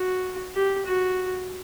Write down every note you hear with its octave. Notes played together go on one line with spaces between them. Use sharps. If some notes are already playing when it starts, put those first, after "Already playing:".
Already playing: F#4
G4
F#4